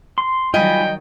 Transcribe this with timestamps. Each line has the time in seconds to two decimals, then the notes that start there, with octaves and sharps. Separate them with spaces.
0.18 C6
0.54 D#3 F#3 G3 F4 D#5 G5 G#5 B5